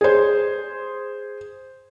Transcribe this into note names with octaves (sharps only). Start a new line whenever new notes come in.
G#4 C5